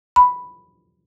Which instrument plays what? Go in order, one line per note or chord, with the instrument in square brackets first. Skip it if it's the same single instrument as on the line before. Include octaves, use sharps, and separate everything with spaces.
[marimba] B5